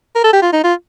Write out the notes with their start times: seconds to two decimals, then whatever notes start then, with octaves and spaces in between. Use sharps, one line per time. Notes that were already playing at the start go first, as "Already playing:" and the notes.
0.15 A#4
0.24 A4
0.33 G4
0.42 F4
0.53 D#4
0.64 F4